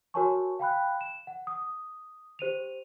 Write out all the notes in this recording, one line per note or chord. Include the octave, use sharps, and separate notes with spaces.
F#4 A#4 C#5 G#5 A5 C#6
F5 G5 B5 F#6
E7
F#5
D#6
G4 C5 D#7 F7